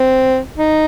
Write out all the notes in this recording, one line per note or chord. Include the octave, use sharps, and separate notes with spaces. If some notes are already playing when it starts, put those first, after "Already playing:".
Already playing: C4
D#4